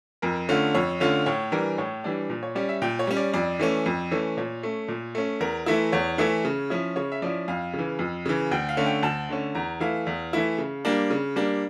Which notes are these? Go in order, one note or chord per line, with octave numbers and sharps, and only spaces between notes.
F2 A#4
D3 A3 C#4 F4
F2 C#5
D3 A3 C#4 F4
A2 C#5
E3 G3 D4 A#4
A2 C#5
E3 G3 D4
A#2
C#5
G3 C#4 D5
E5
A#2 G5
C#5
G3 C#4
D5
F2 D5
E3 A3 C#4
F2
E3 A3 C#4
A#2 C#5
A3 C#4
A#2
A3 C#4
E2 A#4
E3 A3 E4
E2 C#5
E3 A3 E4
C#3
F3 C#4 E4
C#3 C#5
E5
F3 C#4 E4 D5
F2 F5
C#3
E3
F2
C#3 E3
D2 G5
F5
D3 A3 C#4
G5
D2 A5
D3 A3 C#4
E2 A#5
E3 A3 E4 F5
E2
E3 A3 E4
C#3
G3 A#3 D4
C#3
G3 A#3 D4